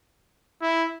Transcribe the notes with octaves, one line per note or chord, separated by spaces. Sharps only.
E4